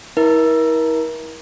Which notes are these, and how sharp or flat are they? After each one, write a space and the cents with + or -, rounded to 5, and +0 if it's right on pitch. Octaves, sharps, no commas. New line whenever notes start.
E4 -35 A#4 +30 E5 -5